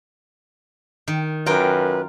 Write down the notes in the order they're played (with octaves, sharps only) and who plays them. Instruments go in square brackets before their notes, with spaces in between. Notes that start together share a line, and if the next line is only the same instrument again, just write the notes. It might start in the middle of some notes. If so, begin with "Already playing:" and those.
[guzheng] D#3
[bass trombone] F#2 [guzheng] F4 A#4 G5 [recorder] B4